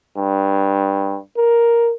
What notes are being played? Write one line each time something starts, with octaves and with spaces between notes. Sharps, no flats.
G2
A#4